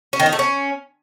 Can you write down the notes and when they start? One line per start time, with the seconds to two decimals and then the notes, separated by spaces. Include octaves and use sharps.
0.13 C#4
0.20 D#3
0.26 D#4
0.32 A3
0.39 C#4